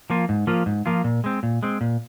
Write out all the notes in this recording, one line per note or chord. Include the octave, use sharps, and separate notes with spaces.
F3 A#3 F4
G#2
F3 A#3 F4
G#2
F3 A#3 F4
A#2
G#3 C4
A#2
G#3 C4
A#2